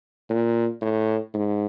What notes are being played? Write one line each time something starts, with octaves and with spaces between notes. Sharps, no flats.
A#2
A2
G#2